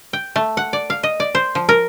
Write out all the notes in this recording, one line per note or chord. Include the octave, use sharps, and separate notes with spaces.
G5
A3
F#5
D5
F5
D#5
D5
C5
F3
A#4